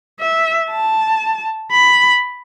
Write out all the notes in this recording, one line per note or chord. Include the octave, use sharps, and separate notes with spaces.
E5
A5
B5